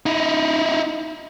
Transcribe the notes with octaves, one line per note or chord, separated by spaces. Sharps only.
D#4 E4